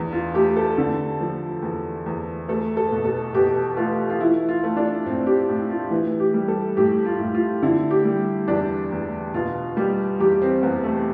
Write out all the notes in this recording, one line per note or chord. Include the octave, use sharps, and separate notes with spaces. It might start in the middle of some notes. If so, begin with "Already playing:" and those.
Already playing: E2 D4
F4
A3 G4
A4
D3
F3
E2
E2
A3 A4
A4
B2
A4
B2 G4
A3 F4
F4
E3 E4
F4
A3
D4
A2 C4
G4
A2
F4
E3
G4
G3
A4
A2 G4
F4
A2
F4
D3 E4
G4
G3
E2 D4
E2
B2 F4
G3 G4
E2 G4
C4
E2 B3
A3